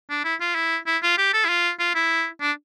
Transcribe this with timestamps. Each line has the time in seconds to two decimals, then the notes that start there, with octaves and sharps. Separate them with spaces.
0.10 D4
0.24 E4
0.41 F4
0.55 E4
0.86 E4
1.03 F4
1.18 G4
1.33 A4
1.45 E4
1.49 F4
1.79 F4
1.95 E4
2.41 D4